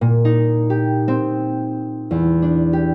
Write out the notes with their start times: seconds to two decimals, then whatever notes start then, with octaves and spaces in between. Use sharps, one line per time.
0.01 A#2
0.25 D#4
0.70 G4
1.08 C4
2.11 E2
2.42 D4
2.73 G4